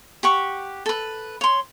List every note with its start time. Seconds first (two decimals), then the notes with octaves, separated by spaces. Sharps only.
0.23 G4 F#5 C#6
0.86 A4 B4
1.41 C#5 C6